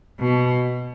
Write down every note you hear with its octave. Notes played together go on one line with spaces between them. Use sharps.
B2